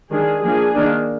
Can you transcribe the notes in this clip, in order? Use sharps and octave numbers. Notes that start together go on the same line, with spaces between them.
D#3 G#3 D4 G#4
F3 A#3 D4 G#4
D#3 A#3 D4